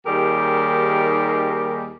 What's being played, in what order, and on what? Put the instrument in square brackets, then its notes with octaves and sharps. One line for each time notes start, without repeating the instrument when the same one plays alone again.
[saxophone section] D#2 D#3 G3 G4 G#4 A#4